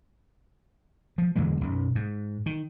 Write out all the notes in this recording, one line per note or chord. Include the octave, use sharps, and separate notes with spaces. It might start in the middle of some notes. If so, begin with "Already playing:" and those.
F3
E2 D3 F#3 G#3
B1 F#2
G#2
D#3